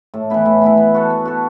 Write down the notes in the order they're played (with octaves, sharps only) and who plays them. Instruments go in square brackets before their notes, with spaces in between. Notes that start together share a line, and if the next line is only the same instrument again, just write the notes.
[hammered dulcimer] A2
E3 B3 E4
A2
E3 B3 E4
B3
F#4 A4
B3
F#4 A4